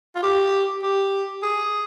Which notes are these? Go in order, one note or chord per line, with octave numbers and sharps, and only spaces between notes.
F4
G4
G4
G#4